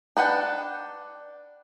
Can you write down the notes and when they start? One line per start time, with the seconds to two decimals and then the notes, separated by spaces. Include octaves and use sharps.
0.17 D4 B4 F#5 G5